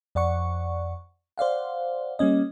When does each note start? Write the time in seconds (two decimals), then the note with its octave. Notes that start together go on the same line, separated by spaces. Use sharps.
0.15 F2 D5 F#5 C#6
1.38 C5 D5 F5 F#5
2.19 G3 A#3 C#4 D#5